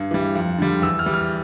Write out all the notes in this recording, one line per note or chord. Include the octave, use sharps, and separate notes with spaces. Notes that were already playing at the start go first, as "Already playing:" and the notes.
Already playing: G2
E3 G3
F2
D3 G3
E2 E6
F6
E3 G3
F6